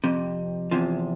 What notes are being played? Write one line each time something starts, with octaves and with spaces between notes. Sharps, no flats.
F2 C3
E2 C3 F3